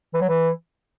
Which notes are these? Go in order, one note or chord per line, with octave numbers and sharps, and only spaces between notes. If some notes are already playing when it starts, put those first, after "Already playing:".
E3
F#3
E3